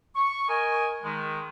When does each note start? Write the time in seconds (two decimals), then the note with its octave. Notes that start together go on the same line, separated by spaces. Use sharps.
0.16 C#6
0.49 A#4 D#5 G#5
1.03 D#3 G#3